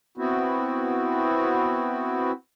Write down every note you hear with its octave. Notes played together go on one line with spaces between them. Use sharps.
B3 C4 E4 F#4